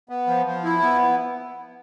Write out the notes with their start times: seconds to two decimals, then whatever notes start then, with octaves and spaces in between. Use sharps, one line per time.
0.09 B3
0.27 F3
0.46 F3
0.64 E4
0.82 B3